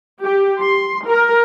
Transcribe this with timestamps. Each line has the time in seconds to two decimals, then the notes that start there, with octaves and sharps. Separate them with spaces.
0.24 G4
0.60 C6
1.06 A#4